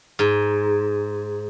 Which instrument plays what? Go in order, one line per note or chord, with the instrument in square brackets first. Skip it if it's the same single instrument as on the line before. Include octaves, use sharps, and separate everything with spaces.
[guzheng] G#2